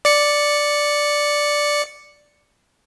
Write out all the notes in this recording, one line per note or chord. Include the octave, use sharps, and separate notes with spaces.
D5 C#7